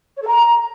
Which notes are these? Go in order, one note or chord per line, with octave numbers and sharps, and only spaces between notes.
C#5
A4
A#5